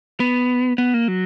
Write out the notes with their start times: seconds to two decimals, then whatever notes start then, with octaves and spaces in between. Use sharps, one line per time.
0.20 B3
0.78 B3
0.94 A#3
1.08 F#3